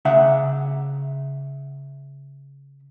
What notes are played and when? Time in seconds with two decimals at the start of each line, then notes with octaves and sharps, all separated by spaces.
0.05 C#3 E5 F#5